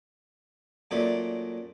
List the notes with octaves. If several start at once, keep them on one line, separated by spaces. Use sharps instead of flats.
F#2 A#2 A3 D5